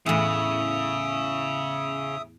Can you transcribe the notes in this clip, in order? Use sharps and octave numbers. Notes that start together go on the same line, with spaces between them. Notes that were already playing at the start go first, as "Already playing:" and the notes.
E2 A2 C#3 E5 D#6